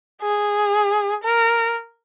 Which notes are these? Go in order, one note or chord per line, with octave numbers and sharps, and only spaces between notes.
G#4
A#4